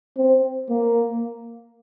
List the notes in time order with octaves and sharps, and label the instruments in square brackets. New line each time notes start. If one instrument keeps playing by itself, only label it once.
[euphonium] C4
A#3